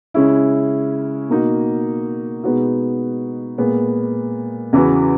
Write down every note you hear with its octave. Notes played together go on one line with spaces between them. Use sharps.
C#3 G#3 C#4 E4
B2 A#3 D#4 F#4
B2 G#3 B3 D#4 F#4
A#2 G#3 B3
E2 C#3 E3 B3 F#4